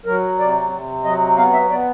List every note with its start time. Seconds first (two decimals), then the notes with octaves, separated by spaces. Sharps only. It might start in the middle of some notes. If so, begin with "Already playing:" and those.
0.06 F#3 A#4
0.39 C3 D5
0.71 C3
1.04 F#3 D#5
1.37 B3 F5
1.53 E5
1.70 B3 D5